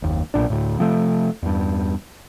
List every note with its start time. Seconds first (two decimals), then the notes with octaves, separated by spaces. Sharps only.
0.02 F#1 D#2
0.34 B1 A#2 D4
0.50 D2 A2
0.79 C3 F3 A3
1.43 E2 G2